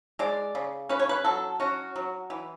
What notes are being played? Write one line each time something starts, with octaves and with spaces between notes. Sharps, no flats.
G#3 D5
C#3
C#4 B4
C#5
B4
F#3 A4
C#4 F#4
F#3
E3